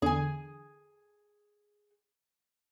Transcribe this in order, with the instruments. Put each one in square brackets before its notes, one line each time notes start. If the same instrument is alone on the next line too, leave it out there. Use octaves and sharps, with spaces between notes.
[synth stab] E2 D3 [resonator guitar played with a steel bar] G#4 G#5